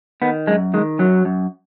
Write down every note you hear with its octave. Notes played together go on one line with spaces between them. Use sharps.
D#3 B3
F#2 G#3
D#3 G#3
F#2 F#3
F#2